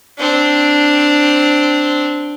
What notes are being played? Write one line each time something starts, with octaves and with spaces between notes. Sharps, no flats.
C4 D4